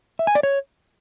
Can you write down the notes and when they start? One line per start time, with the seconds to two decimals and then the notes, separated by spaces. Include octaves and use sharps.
0.19 E5
0.27 G#5
0.35 D5
0.43 C#5